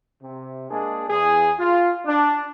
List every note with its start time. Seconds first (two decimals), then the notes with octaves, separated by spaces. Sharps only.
0.21 C3
0.69 G#3 A#3 D4 G#4
1.09 E2 G#4
1.59 F4
2.05 D4